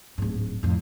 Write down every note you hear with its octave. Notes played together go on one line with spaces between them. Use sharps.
D1 G#2
F2 A2